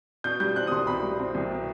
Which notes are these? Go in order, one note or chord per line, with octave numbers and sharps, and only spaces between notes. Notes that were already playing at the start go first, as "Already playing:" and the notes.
B2 G6
G3 G6
C4 F#6
D#6
C2 C6
B2 B5
G3
C4
C2
B2